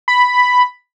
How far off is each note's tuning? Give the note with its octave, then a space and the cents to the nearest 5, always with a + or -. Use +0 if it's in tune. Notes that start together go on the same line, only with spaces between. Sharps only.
B5 +5